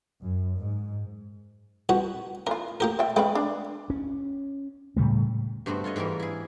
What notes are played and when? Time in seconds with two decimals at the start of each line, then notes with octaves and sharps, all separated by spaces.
0.22 F#2
0.60 G#2
1.89 C2 F#4 B4
2.47 E3 F4 A#4
2.80 A#3 G4 A#4
2.99 D#5 E5 G5
3.16 C#3 G#3 B4 G5
3.35 D4
3.90 C#4
4.97 A2 C#3 G3 A3
5.66 G2 A3 B3 C4 F#4
5.84 F4 A4 C#5 D#5
5.96 G#2 E3 G3 A#3 A#4
6.19 E4 G#4